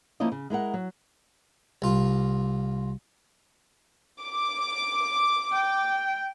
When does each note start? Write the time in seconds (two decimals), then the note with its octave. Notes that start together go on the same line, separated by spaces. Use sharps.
0.20 F3 A#3 C#4 E4 F4 D#5
0.32 C#3
0.50 G#3 E4 A#4 F#5
0.74 F#3
1.82 C2 F4
4.21 D6
5.53 G5